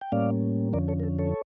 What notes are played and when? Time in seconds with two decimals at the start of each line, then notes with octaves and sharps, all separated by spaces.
0.01 G5
0.12 A2 G3 A#3 C#4 D5 F5
0.73 F2 D3 F3 C#4 A#4 D5
0.88 A4 C#5
1.00 A#4
1.03 A4
1.19 A4 C#5